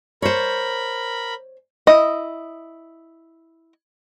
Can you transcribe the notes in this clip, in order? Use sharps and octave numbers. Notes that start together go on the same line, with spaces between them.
A#4 C5 C#5 B5
E4 D#5